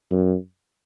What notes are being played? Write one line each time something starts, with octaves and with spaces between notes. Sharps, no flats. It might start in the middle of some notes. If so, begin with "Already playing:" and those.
F#2